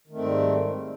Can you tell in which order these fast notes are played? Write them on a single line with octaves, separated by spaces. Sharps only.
D#3 A3 C4 G#2 G3